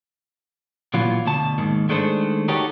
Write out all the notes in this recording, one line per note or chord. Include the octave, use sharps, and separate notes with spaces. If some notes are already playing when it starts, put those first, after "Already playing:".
A#2 E3 F#3 B3 F4
D2 B2 A5
D#2 G#2 D#3
D#3 G#3 A3 D4 A4 C5
D#4 F#4 G4 A4 A#4 C#5